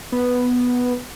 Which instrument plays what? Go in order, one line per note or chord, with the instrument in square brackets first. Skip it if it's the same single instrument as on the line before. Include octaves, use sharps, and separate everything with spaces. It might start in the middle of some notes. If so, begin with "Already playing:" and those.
[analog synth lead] B3